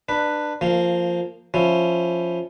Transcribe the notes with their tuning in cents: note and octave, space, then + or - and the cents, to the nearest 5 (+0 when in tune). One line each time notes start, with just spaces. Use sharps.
D4 +25 B4 +0
F3 +0 A#3 -20
F3 +0 C#4 +0 E4 +5